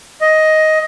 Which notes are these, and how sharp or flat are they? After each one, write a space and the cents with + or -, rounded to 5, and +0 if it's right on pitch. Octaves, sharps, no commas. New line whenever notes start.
D#5 +10